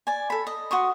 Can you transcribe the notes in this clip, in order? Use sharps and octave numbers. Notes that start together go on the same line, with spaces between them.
D5 G#5
A4 B5
D#5
F#4 C6 C#6 D#6